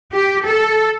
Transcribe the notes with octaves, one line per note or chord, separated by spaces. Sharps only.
G4
A4